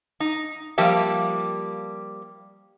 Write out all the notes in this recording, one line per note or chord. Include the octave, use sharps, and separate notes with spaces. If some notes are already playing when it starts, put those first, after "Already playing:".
D#4
F3 G3 A#3 G4 E5